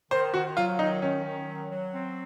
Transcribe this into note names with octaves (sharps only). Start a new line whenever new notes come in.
D#3 C5
D#3 F#4
F#3 F4
D#3 D#4
D#3 C#4
D#3
F#3
F#3
C4